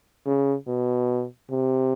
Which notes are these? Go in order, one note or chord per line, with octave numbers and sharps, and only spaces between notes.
C#3
B2
C3